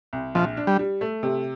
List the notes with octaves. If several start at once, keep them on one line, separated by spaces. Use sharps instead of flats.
C2
A#1 F3
D4
G3
G3
A3
C3